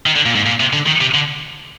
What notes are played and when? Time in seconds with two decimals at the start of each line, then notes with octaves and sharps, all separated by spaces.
0.06 D#3
0.16 D3
0.26 A#2
0.35 G#2
0.46 A#2
0.60 C3
0.73 D3
0.86 D#3
1.01 C3
1.14 D3